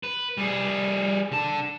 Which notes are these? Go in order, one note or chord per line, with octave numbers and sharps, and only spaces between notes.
B4
G3 G#4
D3 A5